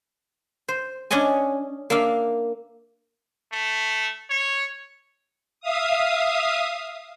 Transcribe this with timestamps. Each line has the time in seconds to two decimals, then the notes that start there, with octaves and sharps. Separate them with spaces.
0.68 C5
1.11 C#4 D4 C#5 D#5 G#5
1.90 A#3 D4 E5 F5
3.53 A3
4.30 C#5
5.60 E5 F5 D#6